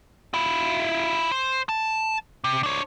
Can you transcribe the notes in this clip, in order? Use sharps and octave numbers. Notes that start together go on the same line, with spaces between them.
E4 F4
C5
A5
C3
D4 C#5